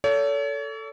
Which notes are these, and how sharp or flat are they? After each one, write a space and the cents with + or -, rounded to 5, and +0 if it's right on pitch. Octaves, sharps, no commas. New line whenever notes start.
A4 +10 C#5 +40